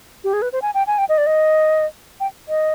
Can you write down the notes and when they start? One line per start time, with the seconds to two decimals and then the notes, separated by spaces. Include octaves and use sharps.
0.24 G4
0.33 G#4
0.42 B4
0.53 C5
0.62 G#5
0.74 G5
0.87 G#5
0.98 G5
1.09 D#5
1.18 D5
1.27 D#5
2.20 G5
2.48 D#5